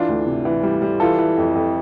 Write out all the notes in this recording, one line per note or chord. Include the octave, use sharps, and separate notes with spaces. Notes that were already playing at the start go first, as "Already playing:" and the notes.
Already playing: E3 D4 F4
D2
C3
E3
G3
G3
E3 F4 A4
E3
F2
F2